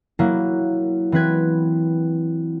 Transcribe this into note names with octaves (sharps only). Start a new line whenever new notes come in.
F#3 A#3 E4
E3 C4 B4 G#6